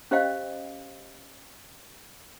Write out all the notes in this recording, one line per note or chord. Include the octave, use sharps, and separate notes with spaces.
C#4 G4 C5 D#5 F5 G5